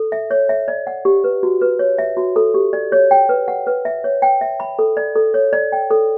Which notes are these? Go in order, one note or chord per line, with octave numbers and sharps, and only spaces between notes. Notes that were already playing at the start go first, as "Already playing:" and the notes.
Already playing: A4
E5
C#5
E5
D5
F#5
G4
B4
F#4
B4
C#5
E5
F#4
A4
G4
D5
C#5
G5
B4
F#5
B4
E5
C#5
G5
E5
B5
A4
D5
A4
C#5
D5
G5
A4